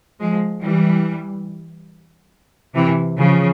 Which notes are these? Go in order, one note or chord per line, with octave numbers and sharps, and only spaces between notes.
F3 G#3
E3 G3
C3 E3
C#3 F3